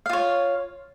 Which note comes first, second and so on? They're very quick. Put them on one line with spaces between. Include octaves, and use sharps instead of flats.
F5 F4 C#5